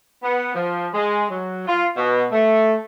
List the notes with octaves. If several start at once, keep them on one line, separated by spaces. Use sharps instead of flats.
B3
F3
G#3
F#3
F4
B2
A3